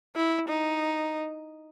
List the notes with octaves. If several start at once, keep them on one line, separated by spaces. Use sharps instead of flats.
E4
D#4